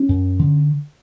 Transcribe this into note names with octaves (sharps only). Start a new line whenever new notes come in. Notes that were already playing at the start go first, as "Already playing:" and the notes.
Already playing: C#4
F#2
D3